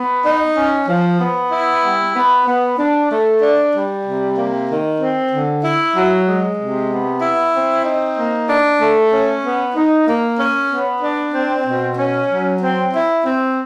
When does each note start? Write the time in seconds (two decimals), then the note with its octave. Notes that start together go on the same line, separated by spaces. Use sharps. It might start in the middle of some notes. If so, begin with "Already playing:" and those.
Already playing: B3
0.25 D#4
0.56 C#4
0.88 F3
1.19 B3
1.51 E4
1.83 G3
2.15 B3
2.46 B3
2.78 D4
3.10 A3
3.42 D4
3.73 G3
4.05 C3
4.37 A#3
4.68 D#3
5.00 C4
5.32 D3
5.64 E4
5.95 F#3
6.27 G#3
6.59 C3
6.90 B3
7.22 E4
7.54 C4
7.85 D#4
8.17 A#3
8.49 D4
8.80 A3
9.12 C#4
9.44 B3
9.76 D#4
10.07 A#3
10.39 C#4
10.70 B3
11.02 D4
11.34 C4
11.66 B2
11.98 C#4
12.29 F#3
12.61 C4
12.92 E4
13.24 C4